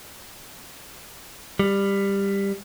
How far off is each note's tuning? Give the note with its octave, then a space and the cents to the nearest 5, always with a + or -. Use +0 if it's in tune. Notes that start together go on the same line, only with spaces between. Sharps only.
G3 +15